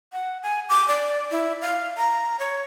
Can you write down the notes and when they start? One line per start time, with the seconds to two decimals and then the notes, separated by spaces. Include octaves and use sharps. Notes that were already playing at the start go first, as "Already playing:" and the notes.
0.13 F#5
0.43 G#5
0.69 D6
0.88 D5
1.31 E4
1.61 F5
1.97 A#5
2.40 C#5